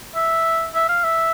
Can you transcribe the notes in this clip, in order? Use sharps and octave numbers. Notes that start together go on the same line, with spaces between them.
E5
E5
F5
E5